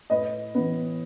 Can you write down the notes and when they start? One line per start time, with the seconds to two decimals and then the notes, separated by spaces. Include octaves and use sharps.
0.10 A2 B4 D#5
0.55 E3 B3 B4